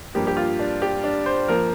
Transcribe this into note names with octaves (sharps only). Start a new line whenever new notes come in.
G2 F3 A#3 G4
G4
F4
D4
G4
D4
C5
F3 A#3 A#4